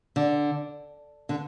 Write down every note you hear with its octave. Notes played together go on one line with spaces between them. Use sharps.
D3
D3